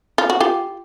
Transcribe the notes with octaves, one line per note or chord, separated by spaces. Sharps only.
F4
F#4
F4 G4